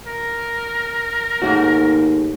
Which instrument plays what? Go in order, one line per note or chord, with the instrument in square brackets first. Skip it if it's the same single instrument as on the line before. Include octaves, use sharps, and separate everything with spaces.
[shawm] A#4
[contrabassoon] D#2 [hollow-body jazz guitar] G#2 A3 F#4